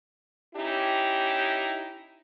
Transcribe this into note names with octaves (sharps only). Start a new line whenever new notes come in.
C#4 D#4 E4 G4